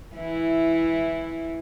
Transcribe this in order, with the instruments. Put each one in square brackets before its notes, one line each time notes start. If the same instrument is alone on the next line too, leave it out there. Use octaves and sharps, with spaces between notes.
[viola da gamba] E3 E4